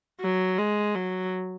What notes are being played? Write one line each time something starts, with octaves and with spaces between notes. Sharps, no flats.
F#3
G#3
F#3